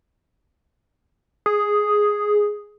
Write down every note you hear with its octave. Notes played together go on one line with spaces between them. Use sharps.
G#4